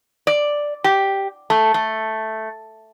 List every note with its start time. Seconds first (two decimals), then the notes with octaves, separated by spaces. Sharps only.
0.27 D5
0.84 G4
1.50 A3
1.74 A3